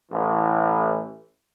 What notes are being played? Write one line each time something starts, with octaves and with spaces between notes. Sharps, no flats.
A1 E3